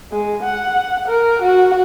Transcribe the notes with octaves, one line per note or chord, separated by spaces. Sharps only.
G#3
F#5
A#4
F#4